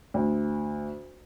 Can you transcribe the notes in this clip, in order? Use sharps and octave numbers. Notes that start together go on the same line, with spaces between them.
D2